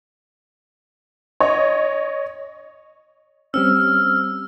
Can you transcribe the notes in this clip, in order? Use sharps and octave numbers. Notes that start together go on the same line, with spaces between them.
C#5 D#5
G3 C4 C#4 E6 F6